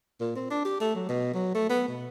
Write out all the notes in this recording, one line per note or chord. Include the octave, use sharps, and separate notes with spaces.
A#2
C4
D4
G4
A3
F#3
B2
F#3
A3
B3
B2